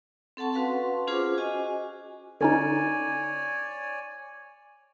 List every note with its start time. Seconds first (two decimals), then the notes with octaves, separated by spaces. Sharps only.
0.37 C4 A4 F#5 A5 C#6
0.53 C#4 F#4 B4 F5 F#5 C6
1.07 C#4 F4 G#4 C5 C#6 D6
1.38 F#4 D#5 G#5
2.41 D3 C#4 D#4 C#5 D5 G#5